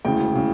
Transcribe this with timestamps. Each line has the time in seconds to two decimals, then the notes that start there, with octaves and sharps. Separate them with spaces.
0.05 E1 D2 C#3 E3 G5
0.35 C#3 E3